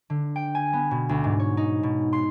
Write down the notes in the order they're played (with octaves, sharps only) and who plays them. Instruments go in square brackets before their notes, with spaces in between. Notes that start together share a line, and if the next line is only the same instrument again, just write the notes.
[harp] D3
G5
G#5
B3
B2
D2
G#2
C#5
D#4
B2
C6